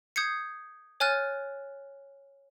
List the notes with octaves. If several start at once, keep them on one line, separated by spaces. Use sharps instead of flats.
D#6 G6 G#6 C7 C#7
C#5 G#5 F6 F#6 A6